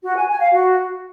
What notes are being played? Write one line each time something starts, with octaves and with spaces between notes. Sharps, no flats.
F#4
G#5
G#5
F5
F#4